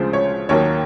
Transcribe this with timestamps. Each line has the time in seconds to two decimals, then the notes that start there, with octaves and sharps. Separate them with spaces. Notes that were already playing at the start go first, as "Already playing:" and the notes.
Already playing: D2 C#3 F3 G#3 C5
0.13 C#5
0.49 D#2 D#3 F#3 A#3 C#5